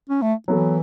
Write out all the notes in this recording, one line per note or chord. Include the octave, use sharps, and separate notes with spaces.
C#4
A3
E3 F#3 B3 A4